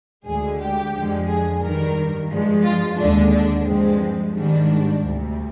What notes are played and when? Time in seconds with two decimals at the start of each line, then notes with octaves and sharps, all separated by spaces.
0.25 D2 D3 G#3 G#4
0.59 G4
0.92 F2 D3 F3 G#3
1.27 G#4
1.61 G2 D#3 G3 A#4
2.29 G2 F3 G#3
2.63 F4
2.97 D#2 D3 G#3 D4
3.31 D4
3.65 G2 F3 G#3 C4
4.33 G#2 D#3 G3 D4
5.01 D2 C3 G3